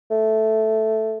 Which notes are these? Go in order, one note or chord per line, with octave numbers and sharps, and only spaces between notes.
A3